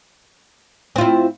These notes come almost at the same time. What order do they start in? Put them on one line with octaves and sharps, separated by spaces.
C4 F4 E4